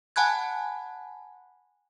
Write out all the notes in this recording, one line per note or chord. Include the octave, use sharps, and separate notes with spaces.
F#5 G#5 A5 B5 F#6 G#6